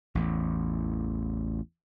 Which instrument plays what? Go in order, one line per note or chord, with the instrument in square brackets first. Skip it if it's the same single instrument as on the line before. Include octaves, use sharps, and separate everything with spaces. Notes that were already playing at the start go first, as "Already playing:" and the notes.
[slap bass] A1 E2